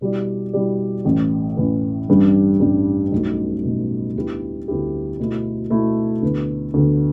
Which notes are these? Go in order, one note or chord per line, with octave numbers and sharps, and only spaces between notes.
B2 G3 E4 G4 D5
B2 G3 E4 G4 D5
A1 A2 E3
A1 A2 E3
A1 G2 G3 D4 G4
A1 G2 G3 D4 G4
B1 B2 A3
B1 B2 A3
D2 D3 B3 E4 G4
D2 D3 B3 E4 G4
B2 A3 E4
B2 A3 E4
D2 D3 B3
D2 D3 B3